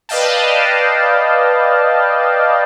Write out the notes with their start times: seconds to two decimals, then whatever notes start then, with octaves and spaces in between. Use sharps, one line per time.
0.09 B4 D5 D#5 F5 G5 A5